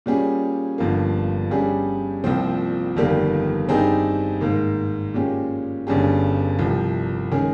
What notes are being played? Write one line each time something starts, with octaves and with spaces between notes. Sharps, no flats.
A#2 G3 C#4 G#4
G1 G2 F3 A#3
G2 G3 C#4 G#4
C2 A#2 F3 C4
G1 F2 D#3 G3 A#3
G2 G3 C4 D#4 G#4
G#2 D#3 A#3
A#2 G#3 C#4 G4
G1 G2 G3 C#4 G#4
C2 C3 F3
D#3 G#3 C#4 G#4